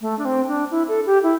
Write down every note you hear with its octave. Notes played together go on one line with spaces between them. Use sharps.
A3
D4
C4
D4
E4
A4
G4
E4